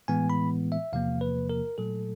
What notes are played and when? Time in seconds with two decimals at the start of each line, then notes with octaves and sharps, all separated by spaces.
0.08 A2 E3 G#3 B3 G#5
0.30 B5
0.72 E5
0.93 E2 C3 F3 A#3 F5
1.21 B4
1.50 A#4
1.78 A#2 F#3 A3 A4